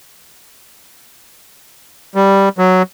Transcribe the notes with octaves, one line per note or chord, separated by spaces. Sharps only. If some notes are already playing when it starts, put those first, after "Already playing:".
G3
F#3